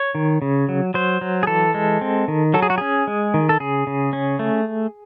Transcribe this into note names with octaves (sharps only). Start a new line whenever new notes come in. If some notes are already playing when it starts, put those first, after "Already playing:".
Already playing: C#5
D#3
C#3
F#3
F#3 C5
F#3
G#4
E3 A4
G#3
C4
D#3
F#3 A4
G#4
F#4
C#4 G#4
G#3
D#3
A4
C#3 G#4
C#3
C#4
A3